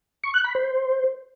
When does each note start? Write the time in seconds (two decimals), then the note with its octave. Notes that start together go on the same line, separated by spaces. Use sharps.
0.24 C#6
0.34 F#6
0.44 B5
0.55 C5